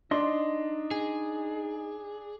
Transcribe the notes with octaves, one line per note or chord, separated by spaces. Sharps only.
D4 D#4 D#5 C6
G#4